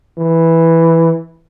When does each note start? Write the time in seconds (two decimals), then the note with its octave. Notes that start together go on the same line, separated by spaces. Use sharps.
0.18 E3